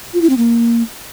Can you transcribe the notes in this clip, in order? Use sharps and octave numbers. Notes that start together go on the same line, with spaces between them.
F4
E4
C4
A#3